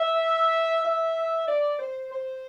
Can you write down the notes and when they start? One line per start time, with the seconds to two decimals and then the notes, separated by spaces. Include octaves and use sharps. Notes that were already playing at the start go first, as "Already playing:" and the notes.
Already playing: E5
0.83 E5
1.47 D5
1.79 C5
2.12 C5